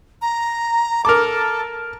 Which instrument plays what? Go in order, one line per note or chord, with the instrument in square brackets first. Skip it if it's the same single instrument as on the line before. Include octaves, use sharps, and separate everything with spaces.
[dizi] A#5
[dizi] A4 [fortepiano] A#4 D6